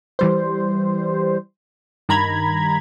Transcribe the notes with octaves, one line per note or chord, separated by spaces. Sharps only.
E3 G3 C5
G2 D#3 A#5 B5 G#6